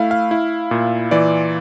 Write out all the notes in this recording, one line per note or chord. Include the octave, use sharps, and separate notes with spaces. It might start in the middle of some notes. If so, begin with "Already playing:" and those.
Already playing: A3 E4 F5
F5
E4
A#2
E3 D5